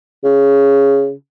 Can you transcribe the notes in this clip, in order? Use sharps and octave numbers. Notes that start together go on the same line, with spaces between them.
C#3